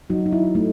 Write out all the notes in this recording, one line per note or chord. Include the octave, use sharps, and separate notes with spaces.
F#3 D#4 F#4
D#4
E4
A3 D#4